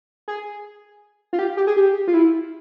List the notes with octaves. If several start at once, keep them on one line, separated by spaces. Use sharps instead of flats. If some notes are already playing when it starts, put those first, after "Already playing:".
G#4
F4
G4
G4
G#4
G4
F4
E4